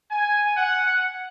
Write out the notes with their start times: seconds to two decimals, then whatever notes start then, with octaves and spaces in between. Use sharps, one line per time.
0.11 G#5
0.56 F#5